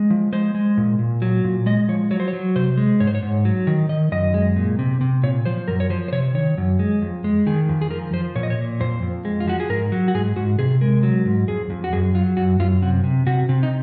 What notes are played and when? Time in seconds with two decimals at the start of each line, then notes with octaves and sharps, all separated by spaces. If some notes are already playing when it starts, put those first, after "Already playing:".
Already playing: G#3
0.10 F3
0.32 G#3 C5
0.55 G#3
0.77 A#2
0.99 A#2
1.22 F#3
1.44 A#2
1.66 G#3 D#5
1.88 F3 C#5
2.11 F#3 C#5
2.20 C5
2.28 C#5
2.33 F#3
2.56 C3 C5
2.77 G#3
3.00 G#2 C#5
3.07 C5
3.15 C#5
3.23 G#2
3.45 F#3
3.67 D#3
3.89 D#3 D#5
4.12 F#2 D#5
4.34 G#3
4.56 A#2
4.79 C3
5.01 C3
5.23 A#2 C#5
5.46 F3 C5
5.68 F#2 A#4
5.80 C#5
5.90 F3 C5
6.08 C5
6.12 C3 C#5
6.35 D#3 C#5
6.58 F#2
6.79 G#3
7.02 F2
7.24 G#3
7.46 D#3 G#4
7.69 F2
7.82 G#4
7.91 F3 A#4
8.13 F3 C5
8.36 A#2 C#5
8.43 D#5
8.50 C#5
8.58 A#2
8.80 F2 C5
9.02 F2
9.25 G#3
9.40 F4
9.47 F3 F#4
9.60 G#4
9.69 G#2 A#4
9.92 F#3
10.08 F#4
10.14 G#2 G#4
10.36 G#2 F#4
10.59 C3 G#4
10.81 G#3 A#4
11.03 F#3
11.25 G#2
11.48 F2 G#4
11.70 F2
11.84 F#4
11.93 F#2 G#4
12.15 F#3 F4
12.37 F#2 F#4
12.60 F#2 F4
12.82 C3 F#4
13.04 C3
13.27 C3 F#4
13.49 C3
13.63 D#4